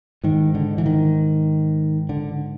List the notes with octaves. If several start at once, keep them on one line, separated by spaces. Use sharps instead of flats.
G#2 D#3
D3
E3
D#3
D3